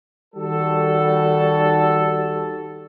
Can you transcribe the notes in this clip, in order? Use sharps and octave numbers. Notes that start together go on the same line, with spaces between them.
D#3 G3 F#4 A4